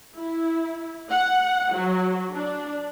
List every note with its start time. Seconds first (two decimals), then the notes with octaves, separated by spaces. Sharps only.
0.16 E4
1.10 F#5
1.73 F#3
2.33 D4